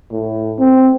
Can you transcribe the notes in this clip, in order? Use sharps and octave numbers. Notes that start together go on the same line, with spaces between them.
A2
C4